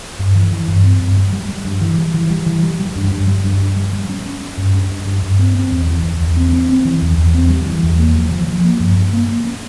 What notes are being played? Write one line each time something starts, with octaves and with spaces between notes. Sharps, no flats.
G2
E3
E3
G2
C4
G2
G3
G3
G3
G2
E3
G3
E3
G3
E3
G3
G3
G2
G2
G3
G2
G2
G3
G3
C#4
C#4
C#4
G2
G2
G2
G2
G2
C4
C4
E2
E3
E2
E2
C4
C4
C4
E3
E2
E2
C4
G3
E3
E2
A#3
F3
F3
F3
A#3
G2
G2
A#3
A#3
C#4